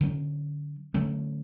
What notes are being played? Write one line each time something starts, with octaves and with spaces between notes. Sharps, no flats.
D3 F#3 A3 C#4
D3 F#3 A3 C#4